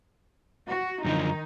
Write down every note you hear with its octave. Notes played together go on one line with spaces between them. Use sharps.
F#4
F#2 D3 D#3 F3 D#4